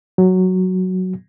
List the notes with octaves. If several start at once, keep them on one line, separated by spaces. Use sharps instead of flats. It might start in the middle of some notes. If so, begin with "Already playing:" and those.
F#3